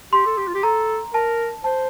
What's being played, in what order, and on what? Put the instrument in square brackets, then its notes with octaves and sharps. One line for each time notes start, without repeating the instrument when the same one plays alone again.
[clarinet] G4 [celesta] C6
[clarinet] A4
G4
F4
G4
[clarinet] A4 [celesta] A#5
[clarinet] A#4 [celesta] A5
[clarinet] C5 [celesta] A5